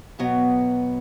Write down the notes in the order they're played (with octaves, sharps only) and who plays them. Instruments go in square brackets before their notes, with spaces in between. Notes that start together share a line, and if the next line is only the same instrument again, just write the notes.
[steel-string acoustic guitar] B2 F#3 B3